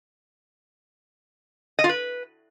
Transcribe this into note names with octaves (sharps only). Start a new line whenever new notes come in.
D#5
F4
B4